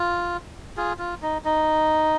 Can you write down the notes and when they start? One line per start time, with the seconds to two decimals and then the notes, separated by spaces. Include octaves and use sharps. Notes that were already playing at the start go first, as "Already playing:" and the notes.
Already playing: F4
0.77 F4 G#4
0.99 F4
1.22 D#4
1.45 D#4